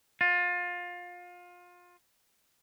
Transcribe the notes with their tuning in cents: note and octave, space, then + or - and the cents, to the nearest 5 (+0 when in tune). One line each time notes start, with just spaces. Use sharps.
F4 +25